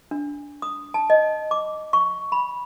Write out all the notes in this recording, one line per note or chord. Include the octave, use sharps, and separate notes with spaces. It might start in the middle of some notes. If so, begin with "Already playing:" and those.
D4
D#6
A5
D#5
D6
C#6
B5